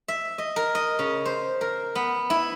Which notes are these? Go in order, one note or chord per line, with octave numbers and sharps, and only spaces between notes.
E5
D#5
A#4
D#5
C#3
C5
A#4
B3
E4